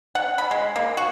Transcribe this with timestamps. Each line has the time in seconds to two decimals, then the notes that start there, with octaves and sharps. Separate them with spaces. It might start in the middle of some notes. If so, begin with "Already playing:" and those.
0.15 F#5
0.38 B5
0.51 G#3
0.76 A#3
0.97 F#4